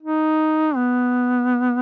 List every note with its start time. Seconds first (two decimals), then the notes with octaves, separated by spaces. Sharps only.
0.03 D#4
0.76 B3